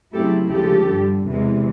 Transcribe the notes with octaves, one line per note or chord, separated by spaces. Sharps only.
C#3 F#3 A3 C4 E4 G4 A4
D2 C#3 F3 G#3 G4 A4
G2 D3 G3
E2 C3 E3 G#3